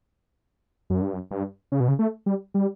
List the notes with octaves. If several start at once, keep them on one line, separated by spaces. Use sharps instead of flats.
F#2
G2
F#2
G2
C#3
B2
C#3
A3
G3
G3